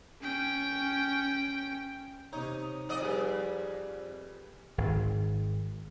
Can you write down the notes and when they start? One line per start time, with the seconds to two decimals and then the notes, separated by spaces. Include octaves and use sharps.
0.21 C#4 G5
2.33 C3 D#4 C#5
2.89 F2 D5 D#5
3.02 G3 G#4 B4
4.78 G#1